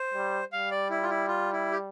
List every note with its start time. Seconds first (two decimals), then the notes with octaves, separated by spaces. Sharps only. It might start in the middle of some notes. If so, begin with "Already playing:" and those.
Already playing: C5
0.14 G3
0.52 G3 F5
0.71 D5
0.90 E4
1.03 F4
1.09 E4
1.28 F4
1.53 E4
1.71 G4